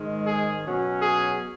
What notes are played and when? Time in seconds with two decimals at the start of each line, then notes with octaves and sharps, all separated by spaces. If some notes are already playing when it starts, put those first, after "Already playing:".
Already playing: G#2 D#3 G#3
0.25 G#4
0.63 B2 F#3 C#4
1.00 G#4